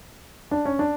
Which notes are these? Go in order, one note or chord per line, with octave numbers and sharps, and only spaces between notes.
D4
C#4
D4